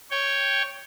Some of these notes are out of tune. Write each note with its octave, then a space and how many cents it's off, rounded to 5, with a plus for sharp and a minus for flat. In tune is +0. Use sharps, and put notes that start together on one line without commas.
C#5 +0 G5 +0